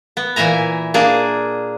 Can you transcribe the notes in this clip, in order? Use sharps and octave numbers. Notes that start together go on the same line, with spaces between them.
B3
A#2 E3 E5 G#5 A#5
A#3 D4 G#4